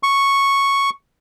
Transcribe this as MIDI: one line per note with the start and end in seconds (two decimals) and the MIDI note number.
0.03 0.90 85